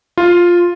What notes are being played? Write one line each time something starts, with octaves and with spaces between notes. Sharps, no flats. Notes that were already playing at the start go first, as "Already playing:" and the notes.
F4